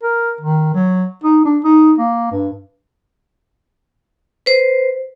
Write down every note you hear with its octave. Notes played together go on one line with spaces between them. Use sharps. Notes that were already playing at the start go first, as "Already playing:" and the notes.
A#4
D#3
F#3
D#4
D4
D#4
A#3
G2
B4 C5